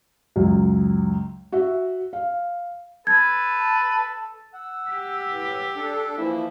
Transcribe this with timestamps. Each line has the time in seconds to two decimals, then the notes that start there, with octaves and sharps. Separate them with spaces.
0.36 C#2 F#2
1.52 F#4 E5
2.13 F5
3.07 A4 B4 A5 G#6
4.54 F#5 E6
4.90 G4
5.29 A2 E3
5.76 D4 A4
6.18 E3 F3 A#3 E4